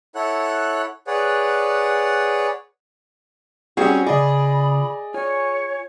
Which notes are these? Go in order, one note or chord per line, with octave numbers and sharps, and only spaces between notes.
E4 A4 C#5 F#5 F#6
G#4 B4 C#5 D5 F#5
G3 C4 C#4 F#4 G#4
C#3 F4 G#4 D5 D#5 B5
F4 C#5 G#5